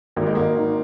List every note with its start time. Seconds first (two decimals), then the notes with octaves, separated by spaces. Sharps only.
0.16 G#1 A#3
0.26 G#3
0.35 G#1 A#3
0.57 D#3